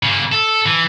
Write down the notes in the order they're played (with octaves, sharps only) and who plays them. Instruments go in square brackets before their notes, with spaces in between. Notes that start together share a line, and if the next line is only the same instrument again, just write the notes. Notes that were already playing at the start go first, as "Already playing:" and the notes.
[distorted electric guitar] C#3 A#3
A4
E3